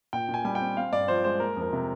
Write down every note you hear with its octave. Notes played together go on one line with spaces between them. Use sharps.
A#2 G5
A#2
G#5
G3 G#5
G5
C4
C4 F5
G2 D5
F3 C5
G#3 C5
A#3 A#4
F2
A#4
C3